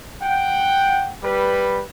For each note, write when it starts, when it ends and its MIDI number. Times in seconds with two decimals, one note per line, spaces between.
0.22 1.10 78
0.22 1.10 79
1.23 1.82 55
1.23 1.82 71